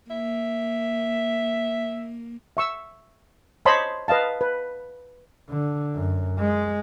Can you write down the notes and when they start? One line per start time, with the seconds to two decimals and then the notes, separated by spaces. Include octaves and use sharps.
0.10 A#3 E5
2.57 E5 C#6 E6
3.65 C5 C#5 D#5 A5 B5 C6
4.08 B4 D#5 F5 A5
4.41 B4
5.49 D3
5.96 F#2
6.39 G#3